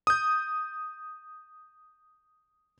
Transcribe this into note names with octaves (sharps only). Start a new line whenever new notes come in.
D#6 G6